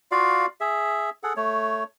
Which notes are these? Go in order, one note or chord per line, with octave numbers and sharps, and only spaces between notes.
F4 F#4 D5 F5
G#4 E5
G#4 A4 F#5
A3 C#5